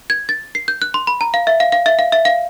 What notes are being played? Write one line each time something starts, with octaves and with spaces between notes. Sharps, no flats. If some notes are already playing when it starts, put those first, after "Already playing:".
G#6
A6
C7
G6
F#6
C6
B5
A#5
F5
E5
F5
F5
E5
F5
E5
F5